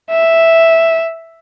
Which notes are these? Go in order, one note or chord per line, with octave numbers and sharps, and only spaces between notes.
E5